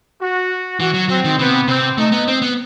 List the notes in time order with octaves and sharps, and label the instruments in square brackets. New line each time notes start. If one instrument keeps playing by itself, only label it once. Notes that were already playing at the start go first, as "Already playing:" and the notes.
[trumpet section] F#4
[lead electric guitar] E3 [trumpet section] F#4
[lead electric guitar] F#3
[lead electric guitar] F#3 [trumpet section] C4
[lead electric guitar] D#3
[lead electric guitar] C3 [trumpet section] B3
[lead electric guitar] C3 [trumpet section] C4
[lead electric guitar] A3 [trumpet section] D#4
[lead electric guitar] B3
C4
B3